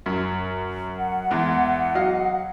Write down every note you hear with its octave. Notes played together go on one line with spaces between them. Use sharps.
F#2
F#5
E2 G#3
F#3 D#5 F5